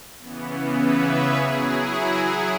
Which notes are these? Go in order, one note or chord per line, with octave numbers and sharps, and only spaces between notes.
C#3 E3 B3
B4 E5
G#4 C#5
F#3 E4 G#4